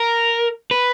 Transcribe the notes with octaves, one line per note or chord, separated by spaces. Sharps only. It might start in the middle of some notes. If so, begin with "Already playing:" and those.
Already playing: A#4
B4